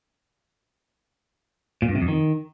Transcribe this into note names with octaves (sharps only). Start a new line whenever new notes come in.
A#2
G2
C3
F2
D#3